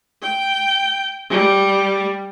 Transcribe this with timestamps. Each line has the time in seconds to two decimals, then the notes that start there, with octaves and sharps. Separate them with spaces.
0.22 G5
1.30 G3